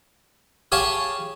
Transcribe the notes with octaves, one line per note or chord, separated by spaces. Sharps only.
G4 G#4 C#5 D5 F5 A5